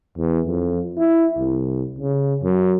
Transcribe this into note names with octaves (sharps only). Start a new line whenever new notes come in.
E2
F2
E4
C2
C#3
F#2